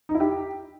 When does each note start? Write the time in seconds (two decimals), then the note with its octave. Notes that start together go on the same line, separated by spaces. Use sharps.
0.09 D#4
0.15 E4
0.20 G4